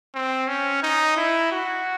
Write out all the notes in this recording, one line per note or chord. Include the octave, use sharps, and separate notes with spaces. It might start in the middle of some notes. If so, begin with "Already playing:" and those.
C4
C#4
D#4
E4
F#4